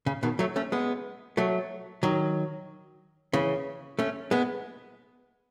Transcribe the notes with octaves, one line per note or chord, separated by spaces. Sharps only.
C#3
B2 D#3
F#3 A3
A3 C#4
G#3 B3
F#3 A3
D#3 F#3
C#3 E3
A3 C#4
G#3 B3